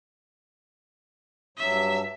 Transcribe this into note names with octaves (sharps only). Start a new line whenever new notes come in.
G2 F#3 E5